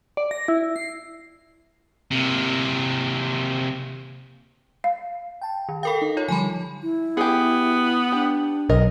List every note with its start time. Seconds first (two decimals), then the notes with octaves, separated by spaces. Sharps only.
0.17 D5
0.31 A#6
0.48 E4
0.76 C7
2.11 C3 A#3
4.84 F5
5.41 G5 A5
5.69 D#3
5.83 A4 A#4 F5 G5 B5
6.02 D#4
6.17 F4 C#5
6.28 D3 F3 G3 G#5 A5 B5
6.82 E4
7.17 B3 G4 G#4
8.12 D4 G4
8.70 B1 A#4 D#5